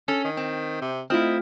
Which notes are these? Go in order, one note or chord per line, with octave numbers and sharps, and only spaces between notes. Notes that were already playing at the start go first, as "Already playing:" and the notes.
C#4 A4
D#3
C4
C3
A3 C4 E4 F4 D#5 F6